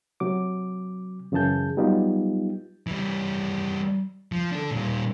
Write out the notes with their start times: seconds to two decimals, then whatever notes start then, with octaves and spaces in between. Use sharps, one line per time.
0.20 C3 F#3 D6
1.32 F#2 C#3 E3 G#4 A5 G6
1.77 F#3 G3 B3 D#4 F4 G4
2.87 E3 G3
4.32 F3
4.52 D4 A4
4.71 A#2 G3